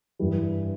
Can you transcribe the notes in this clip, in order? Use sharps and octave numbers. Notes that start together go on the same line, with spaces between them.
G2 E3 G3